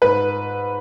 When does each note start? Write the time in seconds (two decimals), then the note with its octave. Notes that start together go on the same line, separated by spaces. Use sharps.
0.02 G#2 B4